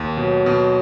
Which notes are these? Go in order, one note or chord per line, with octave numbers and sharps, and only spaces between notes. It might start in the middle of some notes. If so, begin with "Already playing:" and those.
Already playing: D#2
B2 F#3
B2